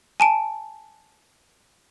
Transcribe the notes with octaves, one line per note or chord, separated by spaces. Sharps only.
G#5 A5 D7